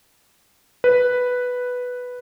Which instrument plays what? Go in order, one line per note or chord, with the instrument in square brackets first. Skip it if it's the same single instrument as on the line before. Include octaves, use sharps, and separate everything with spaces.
[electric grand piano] B4